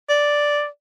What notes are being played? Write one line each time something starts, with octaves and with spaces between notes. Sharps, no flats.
D5